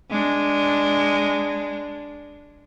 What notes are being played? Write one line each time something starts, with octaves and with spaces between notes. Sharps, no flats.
G#3 D4